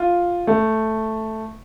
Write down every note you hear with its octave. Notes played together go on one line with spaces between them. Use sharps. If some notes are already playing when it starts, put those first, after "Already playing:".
Already playing: F4
A3